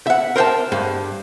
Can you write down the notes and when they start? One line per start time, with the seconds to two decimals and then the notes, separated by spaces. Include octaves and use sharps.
0.07 E5 F#5
0.36 A#4 C5 C#5 G5 A5
0.72 G2